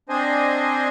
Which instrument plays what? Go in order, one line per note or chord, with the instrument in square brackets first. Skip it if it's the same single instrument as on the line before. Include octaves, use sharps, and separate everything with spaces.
[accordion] C4 D4 C5 D#5 G#5